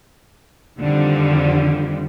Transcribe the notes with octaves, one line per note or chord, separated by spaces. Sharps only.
F2 D3 D#3 F3 G3